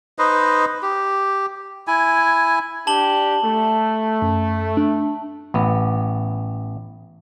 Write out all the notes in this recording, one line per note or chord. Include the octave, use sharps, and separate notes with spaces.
D#4 B4 C5 D#5
G4
E4 G#5
D4 G4 A5 F#7 G7
A3
F#2
D4
A1 B3